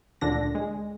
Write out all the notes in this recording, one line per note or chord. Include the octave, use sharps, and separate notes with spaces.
D2 A#2 D3 D4 A#6
G#3